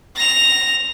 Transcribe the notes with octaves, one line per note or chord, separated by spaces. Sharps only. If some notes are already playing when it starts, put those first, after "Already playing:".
A#6 F7